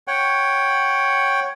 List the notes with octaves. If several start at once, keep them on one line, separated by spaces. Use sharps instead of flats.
C#5 F#5 G5